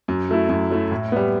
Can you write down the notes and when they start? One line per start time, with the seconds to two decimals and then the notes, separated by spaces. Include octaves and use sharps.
0.08 F#2
0.29 F#3 A3 E4
0.49 F#2
0.70 F#3 A3 E4
0.91 A2
1.12 G3 B3